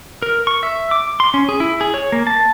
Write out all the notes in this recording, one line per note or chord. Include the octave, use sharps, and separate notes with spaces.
A#4
C#6
E5
D6
C6
C#4
G#4
E4
G#4
C#5
A#3
A5